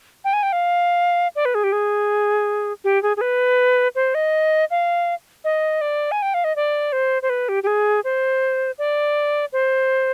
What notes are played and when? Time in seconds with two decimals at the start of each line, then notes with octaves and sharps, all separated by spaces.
0.24 G5
0.33 G#5
0.43 G5
0.52 F5
1.36 D5
1.45 B4
1.55 G#4
1.64 G4
1.72 G#4
2.84 G4
3.03 G#4
3.17 G#4
3.21 B4
3.95 C5
4.14 D#5
4.71 F5
5.44 D#5
5.81 D5
6.11 G#5
6.22 G5
6.34 F5
6.44 D#5
6.56 D5
6.92 C5
7.22 C5
7.29 B4
7.49 G4
7.63 G4
7.67 G#4
8.04 C5
8.78 D5
9.53 C5